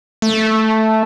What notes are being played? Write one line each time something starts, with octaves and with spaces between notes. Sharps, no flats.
A3